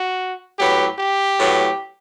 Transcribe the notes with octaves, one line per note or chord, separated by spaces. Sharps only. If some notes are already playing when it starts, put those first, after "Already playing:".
Already playing: F#4
A2 F#3 B3 G4
G4
A2 F#3 B3